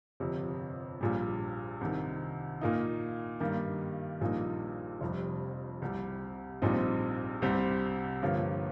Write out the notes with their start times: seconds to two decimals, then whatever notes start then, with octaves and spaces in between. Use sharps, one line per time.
0.20 G1 F2 C3
1.01 A#1 A#2 G3
1.81 C2 C3 D#3
2.61 A#2 A#3 D#4
3.40 G2 D#3 G3 A#3
4.21 A#1 A#2 G3 A#3 D#4
5.01 F1 F2 C3 G3
5.82 C2 C3 G3
6.62 A#1 A#2 G3 C4 D#4
7.42 C2 C3 G3 C4
8.22 G1 G2 F3 A#3 F4